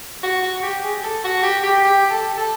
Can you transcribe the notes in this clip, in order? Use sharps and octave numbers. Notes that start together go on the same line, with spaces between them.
F#4
F#4
G4
G#4
A4
F#4
G4
G4
G4
A4
A4